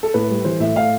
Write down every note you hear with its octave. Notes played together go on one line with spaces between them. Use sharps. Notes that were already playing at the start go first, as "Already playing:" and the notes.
A4
A2 B4
G3
E3 C5
A2 E5
A2 F5